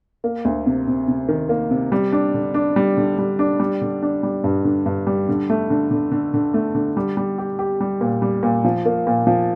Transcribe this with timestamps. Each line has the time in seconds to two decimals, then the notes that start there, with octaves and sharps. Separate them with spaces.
0.24 A#3
0.45 D2
0.66 C3
0.87 C3
1.08 C3
1.29 D#3
1.49 A#3
1.71 C3
1.92 G3
2.12 D4
2.34 D3
2.54 D4
2.76 G3
2.97 D3
3.18 G3
3.39 D4
3.60 G3
3.81 D3
4.02 D4
4.23 G3
4.44 G2
4.65 D3
4.86 G2
5.07 G3
5.29 D3
5.50 A3
5.70 D3
5.91 D3
6.12 D3
6.34 D3
6.54 A3
6.75 D3
6.97 G3
7.17 G3
7.38 G4
7.59 G4
7.80 G3
8.01 A#2
8.22 G3
8.43 A#2
8.65 F3
8.85 A#3
9.07 A#2
9.27 F3